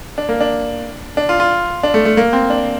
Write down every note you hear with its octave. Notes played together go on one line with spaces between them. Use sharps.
D4
A#3
D4
D4
F4
F4
D4
A3
A3
A#3
C4
D4